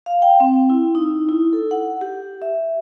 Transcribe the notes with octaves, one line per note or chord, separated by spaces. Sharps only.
F5
G5
C4
E4
D#4
E4
A4
F#5
G4
E5